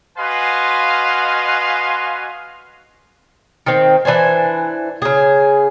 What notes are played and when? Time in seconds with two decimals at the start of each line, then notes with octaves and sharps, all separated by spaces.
0.18 F#4 B4 D#5 F5 G#5 C6
3.66 D#3 C4
4.05 E3 D4 C5 G#5
5.02 C#3 G#4